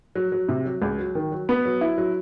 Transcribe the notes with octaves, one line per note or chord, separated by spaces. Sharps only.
F#3
F#3
C3
F#3
C#2
F#3
D#3
F#3
B3
F#3
E4
F#3